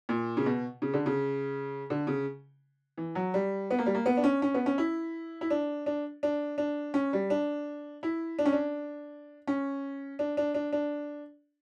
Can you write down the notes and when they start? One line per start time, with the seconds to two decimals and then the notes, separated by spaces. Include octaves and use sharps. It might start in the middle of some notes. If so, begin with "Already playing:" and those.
0.09 A#2
0.37 C#3
0.46 B2
0.82 C#3
0.94 D3
1.06 C#3
1.90 D3
2.07 C#3
2.98 E3
3.15 F#3
3.34 G3
3.71 B3
3.79 A#3
3.86 G3
3.95 A#3
4.06 B3
4.17 D4
4.24 C#4
4.42 C#4
4.54 B3
4.66 C#4
4.78 E4
5.41 E4
5.50 D4
5.86 D4
6.23 D4
6.58 D4
6.94 C#4
7.13 G3
7.30 D4
8.03 E4
8.39 D4
8.46 C#4
8.53 D4
9.47 C#4
10.19 D4
10.37 D4
10.54 D4
10.73 D4